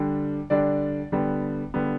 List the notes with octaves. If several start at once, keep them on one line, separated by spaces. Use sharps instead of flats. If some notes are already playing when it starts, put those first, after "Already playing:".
Already playing: D3 G3 D4
D3 G3 D4 D5
D3 G3 B3
D3 G3 B3